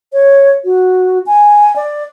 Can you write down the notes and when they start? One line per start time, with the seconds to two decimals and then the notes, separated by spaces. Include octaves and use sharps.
0.13 C#5
0.65 F#4
1.26 G#5
1.76 D5